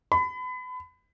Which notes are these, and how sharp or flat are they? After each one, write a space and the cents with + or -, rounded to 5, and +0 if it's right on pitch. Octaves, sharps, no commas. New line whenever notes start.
B5 +30